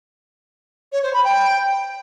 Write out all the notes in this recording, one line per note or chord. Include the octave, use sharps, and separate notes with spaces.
C#5
C5
B5
G5